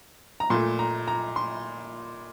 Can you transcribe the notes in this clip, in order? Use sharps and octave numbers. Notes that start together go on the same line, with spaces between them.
A#5
A#2 A3 C6
A#5
A#5
C6